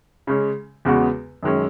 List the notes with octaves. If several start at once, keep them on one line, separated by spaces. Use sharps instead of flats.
C#3 G#3 C#4
E2 C#3 G#3 B3 F#4
F#2 D#3 G#3 C#4